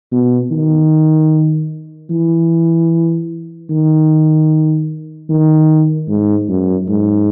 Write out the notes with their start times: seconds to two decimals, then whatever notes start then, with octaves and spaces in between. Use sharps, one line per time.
0.12 B2
0.51 D#3
2.10 E3
3.70 D#3
5.29 D#3
6.08 G#2
6.49 F#2
6.89 G#2